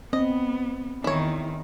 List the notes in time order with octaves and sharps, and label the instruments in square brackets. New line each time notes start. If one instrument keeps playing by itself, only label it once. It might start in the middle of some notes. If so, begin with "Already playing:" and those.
[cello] B3 [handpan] C4 [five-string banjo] D#5
[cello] E2 D#3 [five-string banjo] E4 C#5